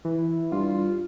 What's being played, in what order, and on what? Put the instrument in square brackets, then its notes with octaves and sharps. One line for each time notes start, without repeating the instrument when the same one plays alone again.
[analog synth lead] E3
[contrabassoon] G2 [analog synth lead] F4